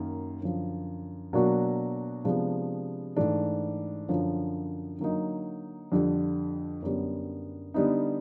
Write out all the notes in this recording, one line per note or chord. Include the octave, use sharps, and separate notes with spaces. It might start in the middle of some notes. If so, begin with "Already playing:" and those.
Already playing: F#2 D#3 A#3
F#2 D3 F3
B2 F#3 A#3 D4 F#4
C3 F3 G#3 B3 D4
G#2 E3 A3 D4
F#2 D3 F3
D3 F#3 A#3 D#4
F2 D3 G3
F#2 D3 G3 B3
D3 G3 B3 D#4